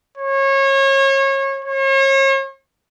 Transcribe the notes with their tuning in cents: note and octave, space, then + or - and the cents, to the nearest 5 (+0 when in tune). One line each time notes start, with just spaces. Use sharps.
C#5 -30
C#5 -40